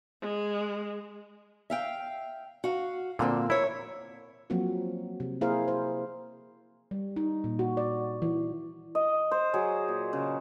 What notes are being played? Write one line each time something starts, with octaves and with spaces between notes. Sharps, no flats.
G#3
E5 F5 G5
F#4 F5
A#2 D3 F3 A#3 C4
E4 A#4 C#5
F3 F#3 A#3 C4 F#4
C3
A#3 E4 G#4 A#4 C5 F5
C5
G3
D#4
A#2
F#4
D5
E3
D#5
C5
F#3 G#4
A#2
C#3